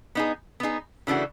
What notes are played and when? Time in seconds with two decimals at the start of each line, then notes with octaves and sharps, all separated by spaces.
0.15 B3 D#4 G#4
0.60 B3 D#4 G#4
1.07 C#3 E3 A3 D4 F#4